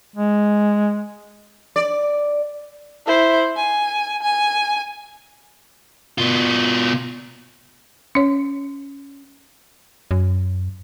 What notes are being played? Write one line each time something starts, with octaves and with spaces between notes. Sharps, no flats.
G#3
D5
E4 C5
G#5
G#5
B2 F4
C#4 C#5
F#2